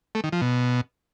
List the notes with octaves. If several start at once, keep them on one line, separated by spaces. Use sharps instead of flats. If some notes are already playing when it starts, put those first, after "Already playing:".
A3
D#3
F3
B2